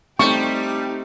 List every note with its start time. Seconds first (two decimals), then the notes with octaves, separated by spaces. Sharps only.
0.19 G3 A3 C4 D#4 G4 E5 C#6